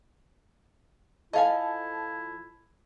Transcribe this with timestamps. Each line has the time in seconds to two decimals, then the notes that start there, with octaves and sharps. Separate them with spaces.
1.33 F3 E4 A4 D#5 F5 G#5 A5